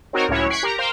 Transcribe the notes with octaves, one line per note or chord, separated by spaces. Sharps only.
C4 D#4 F#4 A#4 C#5
C#2 A2 F#3 C#4 E4 C#5
C#6 F#6 G#6 B6 C7 D7
G4 A#4 A#5
A#4 C5 F5 G5 C6